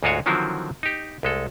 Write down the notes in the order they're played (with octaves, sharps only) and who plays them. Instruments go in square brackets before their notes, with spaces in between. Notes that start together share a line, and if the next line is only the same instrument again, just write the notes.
[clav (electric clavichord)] D2 G#2 G#3 F4 F#4 C#5
D3 D#3 F3 F#3 C4 E4
D#4 G4
C2 G#3 A4